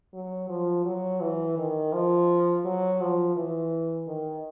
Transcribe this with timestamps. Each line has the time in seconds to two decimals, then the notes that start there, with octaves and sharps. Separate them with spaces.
0.14 F#3
0.49 F3
0.85 F#3
1.21 E3
1.58 D#3
1.93 F3
2.65 F#3
3.01 F3
3.36 E3
4.07 D#3